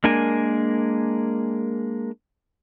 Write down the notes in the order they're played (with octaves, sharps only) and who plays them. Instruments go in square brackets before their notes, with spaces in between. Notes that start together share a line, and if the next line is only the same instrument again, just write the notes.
[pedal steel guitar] G#3 A#3 D4 A#4 G#5